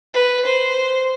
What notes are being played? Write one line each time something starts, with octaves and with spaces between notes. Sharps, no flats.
B4
C5